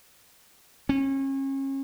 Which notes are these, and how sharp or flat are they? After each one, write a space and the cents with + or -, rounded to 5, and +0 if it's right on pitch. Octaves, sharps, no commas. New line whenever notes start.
C#4 -35